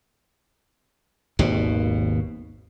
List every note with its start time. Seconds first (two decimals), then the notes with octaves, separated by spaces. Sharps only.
1.39 G#1 D#2 B2